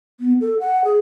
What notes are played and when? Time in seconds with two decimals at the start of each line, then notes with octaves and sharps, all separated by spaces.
0.20 B3
0.41 A4
0.60 F#5
0.84 G#4